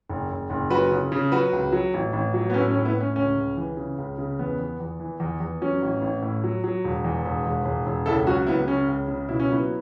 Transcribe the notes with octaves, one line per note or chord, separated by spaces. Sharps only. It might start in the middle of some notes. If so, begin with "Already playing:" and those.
F#1
F#1
F#1
F#3 F#4 B4
C#3
C#3
F#3 F#4 B4
C#2
F#3
A1
A1
F#3
B3
A2 C#4
C#4
A2
B3 E4
A2 C#4
C#2 C#4
C#2
E3
C#3
C#2
C#3
E2 B3
E2
E2
E3
E2
E2
F#3 C#4
A1
A1
A2
F#3
F#3
E1
E2
E1
E1
E1
E1
C#2 E4 A4
F#3 C#4 F#4
C#2 B3 E4
C#3 C#4
C#2
C#3
B2 E4
C#4
F#3 B3 E4